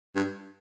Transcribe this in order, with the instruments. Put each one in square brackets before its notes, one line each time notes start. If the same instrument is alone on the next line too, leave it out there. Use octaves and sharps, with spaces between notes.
[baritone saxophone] G2